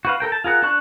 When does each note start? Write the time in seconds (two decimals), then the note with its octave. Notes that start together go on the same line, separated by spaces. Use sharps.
0.05 F#4 B4 F5
0.20 A4 A#4 G5
0.32 A5
0.44 F4 G#4 A#4 F#5
0.62 D4 D5 A5 C#6 F#6